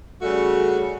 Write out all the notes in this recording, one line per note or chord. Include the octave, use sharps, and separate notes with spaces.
C#3 G3 A3 F#4